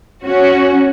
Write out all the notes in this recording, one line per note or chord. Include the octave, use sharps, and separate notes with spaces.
C#4 F#4